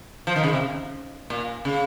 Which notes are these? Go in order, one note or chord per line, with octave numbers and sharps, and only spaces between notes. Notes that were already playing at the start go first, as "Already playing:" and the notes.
F3
D#3
C#3
C3
A#2
C#3